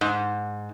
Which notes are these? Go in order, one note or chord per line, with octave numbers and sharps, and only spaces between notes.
G#2